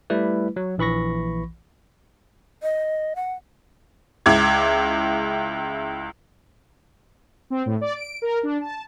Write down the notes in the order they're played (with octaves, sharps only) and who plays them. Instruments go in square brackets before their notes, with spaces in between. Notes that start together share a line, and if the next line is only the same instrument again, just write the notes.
[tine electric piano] G3 A3 E4 B4
F#3
A#1 E3 B5 C#6 A#6
[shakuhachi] D#5
F#5
[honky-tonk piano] C#2 E4 D6 G#6
[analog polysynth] C4
A2
D5
D7
A#4
D4
A5